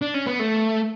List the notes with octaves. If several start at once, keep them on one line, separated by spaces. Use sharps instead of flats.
D4
C#4
B3
A3